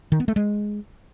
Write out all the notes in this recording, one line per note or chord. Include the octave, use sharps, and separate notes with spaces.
D#3
B3
A3
G#3